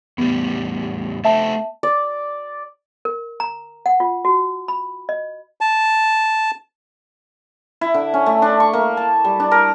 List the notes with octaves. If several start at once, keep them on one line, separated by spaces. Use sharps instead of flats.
E2 A2 G3 B3
A3 C4 E5 A5
D5
A#4
A#5
F#5
F4
F#4
B5
D#5
A5
E4
D3
C#4
A3
D4
C#6
A#3
A5
G3
D4
A#4